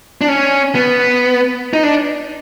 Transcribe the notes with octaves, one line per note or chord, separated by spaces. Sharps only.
D4
C#4
B3
D#4
D4